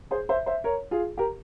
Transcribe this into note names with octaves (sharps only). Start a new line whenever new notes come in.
G#4 C5
C5 E5
C5 E5
A#4 C#5
F4 G#4
G4 A#4